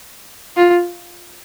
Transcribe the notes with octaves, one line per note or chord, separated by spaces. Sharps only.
F4